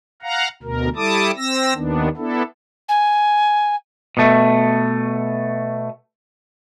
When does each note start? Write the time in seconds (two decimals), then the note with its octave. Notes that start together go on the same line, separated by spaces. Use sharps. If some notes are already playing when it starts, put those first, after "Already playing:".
0.23 F5 F#5 A#5
0.63 D2 B2 A#4
0.96 G3 E4 A4 A5 D6 D#6
1.37 C4 E6 A#6
1.75 D#2 D#3 B3 D4
2.17 B3 D4 E4 A4
2.89 G#5
4.17 B2 A3